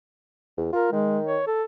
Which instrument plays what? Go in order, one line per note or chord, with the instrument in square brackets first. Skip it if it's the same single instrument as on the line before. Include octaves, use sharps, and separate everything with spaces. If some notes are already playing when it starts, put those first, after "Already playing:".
[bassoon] E2
[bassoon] F4 [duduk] A#4
[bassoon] D#3 [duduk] G#3
[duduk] C#5
A4